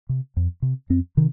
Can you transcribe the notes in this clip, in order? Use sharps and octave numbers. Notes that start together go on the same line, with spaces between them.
C3
F2
C3
F2 C4
C3 D#3